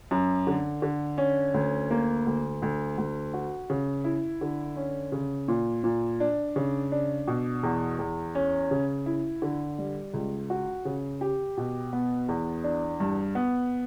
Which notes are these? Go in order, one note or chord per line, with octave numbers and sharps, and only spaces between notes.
F#2
D3
D3
C#4
D2
A#3
D2
D2
D2
F#4
C#3
E4
D3
C#4
C#3
A#2
A#2
D4
C#3
D4
B2
E2
E2
C#4
C#3
E4
D3
G3
C#2
F#4
C#3
G4
B2
B3
E2
D4
G2
B3